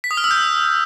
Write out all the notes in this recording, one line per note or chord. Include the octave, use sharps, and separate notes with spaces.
B6
D#6
F6
E6
G6